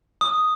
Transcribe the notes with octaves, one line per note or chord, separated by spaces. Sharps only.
D#6